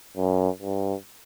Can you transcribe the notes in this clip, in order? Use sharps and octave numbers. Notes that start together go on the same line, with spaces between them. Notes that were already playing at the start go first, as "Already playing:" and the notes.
F#2
G2